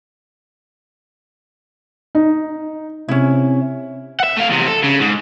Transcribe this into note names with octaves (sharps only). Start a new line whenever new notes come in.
D#4
C3 C#4 E4
E5 F#5
A3 F5
E2 C3
A4
C#3
G#2